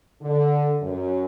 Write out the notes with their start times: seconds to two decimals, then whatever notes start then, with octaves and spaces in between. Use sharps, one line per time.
0.21 D3
0.82 F#2